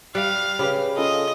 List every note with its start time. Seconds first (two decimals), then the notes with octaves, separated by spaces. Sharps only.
0.15 G3 F5 F#6
0.59 C#3 G4 B4 B5
0.97 C#4 F4 A4 D#5